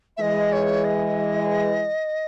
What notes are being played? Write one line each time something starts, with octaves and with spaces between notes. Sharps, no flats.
E5
E3 G#3 D#5
C#5
D#5